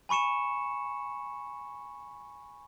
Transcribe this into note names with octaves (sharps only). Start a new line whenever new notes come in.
G#5 B5 C#6 C#7 E7